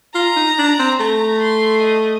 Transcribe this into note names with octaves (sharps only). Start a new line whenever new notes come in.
F4 A#5
D#4
D4
C4
A3 A#5
C6
D#5